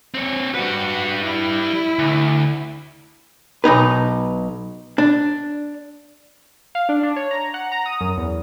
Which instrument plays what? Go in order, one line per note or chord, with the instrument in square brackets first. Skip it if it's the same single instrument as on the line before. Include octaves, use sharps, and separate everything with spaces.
[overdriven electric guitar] C4 C#5
[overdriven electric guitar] G3 B4 [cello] F#4
[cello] E4
[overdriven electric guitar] D2
[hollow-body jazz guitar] B1 F#2 D#4 B4
D4
[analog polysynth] F5
D4
D4
C#5
A#5
F#5
A#5
D#6
F#2
E2